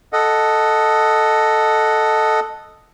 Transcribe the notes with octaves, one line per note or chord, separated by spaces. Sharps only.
A4 D#5 F#5